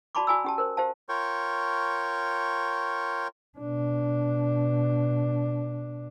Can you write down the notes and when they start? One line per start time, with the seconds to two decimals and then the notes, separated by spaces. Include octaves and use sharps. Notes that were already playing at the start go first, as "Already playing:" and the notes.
0.15 F#4 D5 A5 B5 C6 D6
0.27 F#4 D5 G#5 A#5 B5 E6
0.44 C#4 G4 A5
0.58 A#4 C5
0.77 G4 C5 F5 A5
1.09 F4 A#4 C#5 G5 C#6
3.58 B2 D4